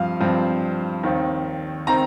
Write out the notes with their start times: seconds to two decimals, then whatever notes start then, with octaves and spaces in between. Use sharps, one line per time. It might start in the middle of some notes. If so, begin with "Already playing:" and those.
Already playing: G2 F3 C4 F5
0.20 G2 F3 C4
1.03 D#2 D#3 C4
1.87 D#3 C4 A#5